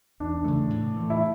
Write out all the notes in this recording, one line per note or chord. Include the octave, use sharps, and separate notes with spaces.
E2 D4
C#3 E3 A3
A2
E3 A3
E4